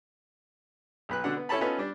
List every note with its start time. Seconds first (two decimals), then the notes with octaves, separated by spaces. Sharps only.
1.09 B1 B4 F#6
1.24 B2 D3 D4 F#5
1.36 B3
1.49 C#4 E4 A4 C#5 A5 B5
1.61 B3 C#4 D#4 F4 A4 B4
1.78 G3 D4